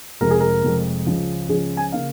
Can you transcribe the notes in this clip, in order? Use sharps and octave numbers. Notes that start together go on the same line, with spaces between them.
F1 F2 F3 G#3 A#4
G#4
A#4
F1 F2 F3 G#3
C#2 C#3 F3 C#4
C#2 C#3 F3 C#4 G#4
G#5
C#3 A#3 F5